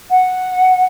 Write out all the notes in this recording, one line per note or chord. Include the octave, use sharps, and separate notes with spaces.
F#5